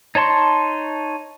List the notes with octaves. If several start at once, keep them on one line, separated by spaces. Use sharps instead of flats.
D#4 C#5 A5 C6 C#6